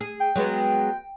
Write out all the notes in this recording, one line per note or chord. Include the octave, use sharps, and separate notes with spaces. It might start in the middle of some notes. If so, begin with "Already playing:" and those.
G#4
G5
F#3 G#3 B3